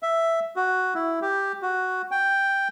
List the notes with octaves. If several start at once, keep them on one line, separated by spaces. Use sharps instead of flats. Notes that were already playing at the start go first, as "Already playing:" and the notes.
E5
F#4
E4
G4
F#4
G5